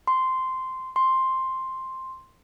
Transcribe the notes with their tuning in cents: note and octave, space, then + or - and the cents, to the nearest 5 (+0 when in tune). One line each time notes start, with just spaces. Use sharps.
C6 -10
C6 +5